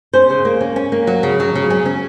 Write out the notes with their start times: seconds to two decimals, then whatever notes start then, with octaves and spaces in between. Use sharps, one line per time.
0.13 C#4 C5
0.30 C#3
0.45 A#3
0.61 C#4
0.76 C#4
0.92 A#3
1.07 F#3
1.23 C#3
1.40 F#3
1.55 C#3
1.70 C#4
1.86 C#4